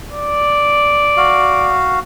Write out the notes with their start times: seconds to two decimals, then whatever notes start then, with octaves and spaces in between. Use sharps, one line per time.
0.11 D5
1.17 F#4 F5